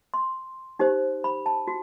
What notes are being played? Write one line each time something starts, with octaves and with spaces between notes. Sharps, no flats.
C6
D#4 G4 C5
B5
A5
F#4